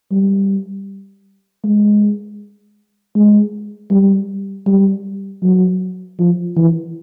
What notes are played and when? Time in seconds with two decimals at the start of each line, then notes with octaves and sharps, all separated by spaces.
0.11 G3
1.64 G#3
3.15 G#3
3.91 G3
4.66 G3
5.43 F#3
6.19 F3
6.56 E3